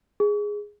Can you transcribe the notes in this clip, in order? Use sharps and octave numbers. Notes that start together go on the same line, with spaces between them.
G#4